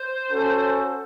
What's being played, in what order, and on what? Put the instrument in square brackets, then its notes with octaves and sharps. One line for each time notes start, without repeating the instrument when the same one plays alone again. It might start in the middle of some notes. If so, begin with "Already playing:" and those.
Already playing: [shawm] C5
[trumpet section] C#4 F#4 A4